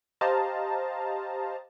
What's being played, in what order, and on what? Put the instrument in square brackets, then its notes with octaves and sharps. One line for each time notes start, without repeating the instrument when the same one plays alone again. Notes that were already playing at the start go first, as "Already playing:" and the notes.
[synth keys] G4 C5 D#5 F5 A5 A#5